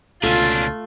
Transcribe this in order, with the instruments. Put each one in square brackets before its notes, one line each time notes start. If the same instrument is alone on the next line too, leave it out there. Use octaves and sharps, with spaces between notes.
[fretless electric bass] C#2 B2 D3 [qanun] A3 [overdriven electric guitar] C#4 D4 [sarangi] F4